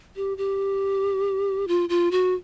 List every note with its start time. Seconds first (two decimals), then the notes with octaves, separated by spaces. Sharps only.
0.16 G4
0.37 G4
1.68 F4
1.89 F4
2.11 F#4